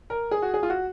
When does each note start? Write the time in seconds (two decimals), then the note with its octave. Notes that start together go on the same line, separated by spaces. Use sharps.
0.10 A#4
0.31 G#4
0.42 F#4
0.54 G#4
0.63 F4
0.70 F#4